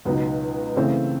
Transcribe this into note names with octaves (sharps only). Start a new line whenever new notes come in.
C#2 B2 F#3 B3 D#4
C#3 E3 A3 C4